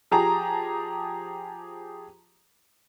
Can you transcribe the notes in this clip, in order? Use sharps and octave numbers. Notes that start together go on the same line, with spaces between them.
F3 G4 G#4 A5 A#5